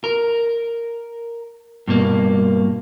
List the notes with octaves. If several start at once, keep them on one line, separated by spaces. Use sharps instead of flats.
A#4
G2 B2 A#3